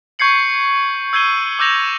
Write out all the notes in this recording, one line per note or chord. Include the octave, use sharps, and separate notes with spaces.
C#6 G6 G#6 C7 C#7 F#7
E6 G6 G#6 C7 D#7 G7
D6 E6 G6 A#6 F7 G7